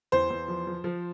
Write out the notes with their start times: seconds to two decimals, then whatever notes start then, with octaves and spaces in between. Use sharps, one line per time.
0.12 E2 C5
0.30 E2
0.48 F3
0.67 F3
0.84 F3